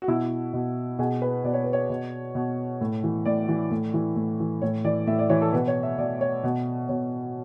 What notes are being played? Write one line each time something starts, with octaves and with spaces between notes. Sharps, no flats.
F#4
B2 E4
B2
B2 G#4
B4
B2 D5
C#5
B4
C#5
B2
B2
A2
E3
A2 D5
E3
A2
E3
A2
E3
A2 C#5
E3 D5
A2 E5
D5
E3 C#5
A4
B2 B4
C#5
E5
B2 D5
C#5
B2
B2 C#5